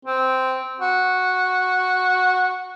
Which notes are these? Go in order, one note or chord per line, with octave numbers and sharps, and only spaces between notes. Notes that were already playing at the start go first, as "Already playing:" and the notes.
C4
F#4